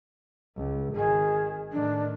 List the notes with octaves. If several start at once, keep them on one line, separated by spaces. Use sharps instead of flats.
C#2
G#1 D#3 G#4
A2 D#3 D4